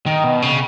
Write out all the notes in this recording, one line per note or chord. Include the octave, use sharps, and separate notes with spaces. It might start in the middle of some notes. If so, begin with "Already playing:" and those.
D#3
B2
C#3